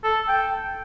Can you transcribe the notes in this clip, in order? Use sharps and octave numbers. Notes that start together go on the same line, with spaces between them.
A4
G5